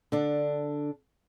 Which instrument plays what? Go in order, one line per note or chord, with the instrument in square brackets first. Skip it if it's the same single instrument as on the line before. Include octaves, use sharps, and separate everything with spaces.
[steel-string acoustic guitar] D3 D4